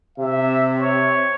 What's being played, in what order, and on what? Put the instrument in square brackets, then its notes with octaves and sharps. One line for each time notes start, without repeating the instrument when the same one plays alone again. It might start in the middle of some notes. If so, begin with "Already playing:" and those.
[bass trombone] C3 [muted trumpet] E5
[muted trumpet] C#5